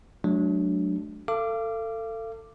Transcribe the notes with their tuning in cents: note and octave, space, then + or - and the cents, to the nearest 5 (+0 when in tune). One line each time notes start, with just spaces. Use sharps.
F#3 +0 A3 -40 D4 +0
A4 +25 F5 -35 D6 +0